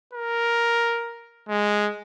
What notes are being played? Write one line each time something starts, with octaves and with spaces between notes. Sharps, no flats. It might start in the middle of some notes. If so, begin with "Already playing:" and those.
A#4
G#3